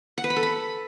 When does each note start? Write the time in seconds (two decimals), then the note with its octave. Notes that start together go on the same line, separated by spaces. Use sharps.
0.18 F#5
0.24 B4
0.30 B5
0.36 A4
0.43 B5